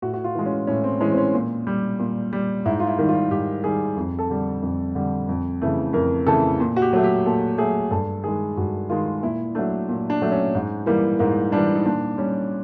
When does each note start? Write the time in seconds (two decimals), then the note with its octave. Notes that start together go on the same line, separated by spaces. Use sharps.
0.02 A2 F#4
0.14 F#4
0.24 F4
0.35 E3 G#3
0.46 C#4
0.67 A2 C#4
0.84 C4
1.01 E3 G#3 C#4
1.12 C4
1.17 C#4
1.34 A#2
1.67 G3
1.99 A#2
2.33 G3
2.65 G#2 E4
2.80 F4
2.87 E4
2.98 D#3 G3
3.09 F4
3.31 G#2 G4
3.64 D#3 G3 G#4
3.97 F2
4.19 A4
4.30 D3 G3
4.62 F2
4.95 D3 G3
5.29 F2
5.62 C#3 E3 A3
5.93 F2 A#4
6.27 C#3 E3 A3 A4
6.60 A#2
6.76 F#4
6.82 G4
6.93 F#3 A3
7.04 G4
7.26 A#2 A4
7.58 F#3 A3 G#4
7.91 G2 A4
8.24 D#3 G#3 G#4
8.57 G2 F#4
8.89 D#3 G#3 F4
9.23 A#2 E4
9.55 F#3 A3 D4
9.89 A#2
10.10 D4
10.22 F#3 A3
10.32 C#4
10.55 G#2
10.86 E3 G3 A#3
11.19 G#2 A#3
11.52 E3 G3 D4
11.75 D#4
11.86 A#2 D4
12.18 G3 C#4